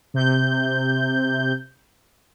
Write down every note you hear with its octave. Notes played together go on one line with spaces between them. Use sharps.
C3 G6